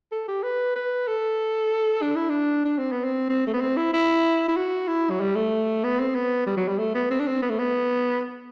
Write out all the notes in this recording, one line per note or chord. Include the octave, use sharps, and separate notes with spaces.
A4
G4
B4
B4
A4
D4
E4
D4
D4
C4
B3
C4
C4
A3
B3
C4
E4
E4
E4
F#4
E4
F#3
G3
A3
B3
C4
B3
G3
F#3
G3
A3
B3
C4
D4
C4
B3
A3
B3